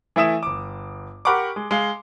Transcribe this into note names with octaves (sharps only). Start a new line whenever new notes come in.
E3 A3 E4 E5 D#6 E7
G1 D6
G4 A#4 F#5 B5 C#6 D6
G#3
G#3 F5